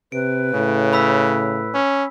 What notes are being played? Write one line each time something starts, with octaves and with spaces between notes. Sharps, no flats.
C3 B4 D7
A2 C#3
B5 E6 B6
C#4